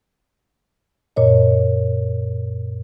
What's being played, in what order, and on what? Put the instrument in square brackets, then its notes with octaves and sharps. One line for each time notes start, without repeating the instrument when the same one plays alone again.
[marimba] F#2 A#2 C#5 D#5